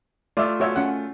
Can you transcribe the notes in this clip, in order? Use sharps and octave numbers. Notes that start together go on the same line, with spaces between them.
A3 F4 D5 E5
F#4 C#5 E5
C#4 F#5